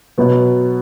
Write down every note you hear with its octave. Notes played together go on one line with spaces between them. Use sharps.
B2 F#3 B3